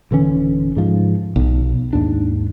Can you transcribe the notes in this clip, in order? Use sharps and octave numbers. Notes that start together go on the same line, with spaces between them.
D#1 D3 E3 C#4
G#2 F3
B1
D#2 G#2 D4